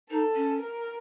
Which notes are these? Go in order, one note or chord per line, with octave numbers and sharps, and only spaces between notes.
D#4 A4
C#4
A#4